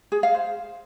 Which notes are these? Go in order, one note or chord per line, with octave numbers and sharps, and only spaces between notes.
G#4
F5
C5